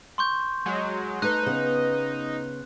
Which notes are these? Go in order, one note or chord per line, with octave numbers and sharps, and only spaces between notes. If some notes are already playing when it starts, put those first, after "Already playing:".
C6 C#6 G6
F#3 G#3
A3 D#4 B4 F#6
C#3 B3